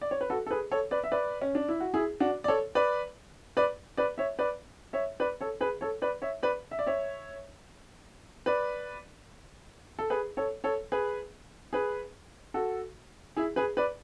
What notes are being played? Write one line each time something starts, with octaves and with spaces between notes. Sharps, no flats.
D5
C#5
B4
F#4 A4
A4
G#4 B4
A4 C#5
B4 D5
E5
B4 D5
C#4
D4
E4
F#4
E4 G#4
D4 F#4
D5
A4 C#5
B4 D5
B4 D5
B4 D5
C#5 E5
B4 D5
C#5 E5
B4 D5
A4 C#5
G#4 B4
A4 C#5
B4 D5
C#5 E5
B4 D5
E5
D5
C#5 E5
B4 D5
A4
G#4 B4
A4 C#5
A4 C#5
G#4 B4
G#4 B4
F#4 A4
E4 G#4
G#4 B4
B4 D5